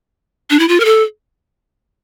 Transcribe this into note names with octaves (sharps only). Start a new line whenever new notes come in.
D4
E4
F4
A#4
A4